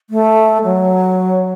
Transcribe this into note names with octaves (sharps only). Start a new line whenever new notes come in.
A3
F#3